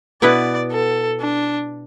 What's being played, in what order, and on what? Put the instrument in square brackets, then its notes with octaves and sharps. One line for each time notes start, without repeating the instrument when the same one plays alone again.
[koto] B2 B3 E4 B4 [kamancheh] D5
[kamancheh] A4
D4